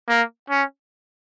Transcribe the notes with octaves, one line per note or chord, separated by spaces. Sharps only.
A#3
C#4